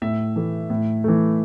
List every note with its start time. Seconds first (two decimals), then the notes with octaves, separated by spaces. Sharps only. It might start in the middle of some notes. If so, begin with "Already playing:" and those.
0.02 A2 E5
0.36 E3 A3
0.70 A2
1.04 E3 A3